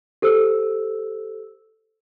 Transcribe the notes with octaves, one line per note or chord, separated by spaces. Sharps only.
G4 A4 C5 E6